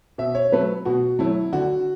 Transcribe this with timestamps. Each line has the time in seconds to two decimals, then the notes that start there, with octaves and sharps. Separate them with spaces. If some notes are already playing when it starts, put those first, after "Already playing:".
0.18 B2 E5
0.35 C#5
0.52 F#3 A3 B4
0.85 B2 F#4
1.19 F#3 A3 E4
1.52 D3 F#4